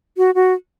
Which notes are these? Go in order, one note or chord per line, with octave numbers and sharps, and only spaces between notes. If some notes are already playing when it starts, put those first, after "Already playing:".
F#4
F#4